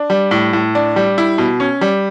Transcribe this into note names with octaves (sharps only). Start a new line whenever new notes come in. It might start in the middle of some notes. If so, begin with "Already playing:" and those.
Already playing: D4
G3
A2
A2
D4
G3
E4
B2
C#4
G3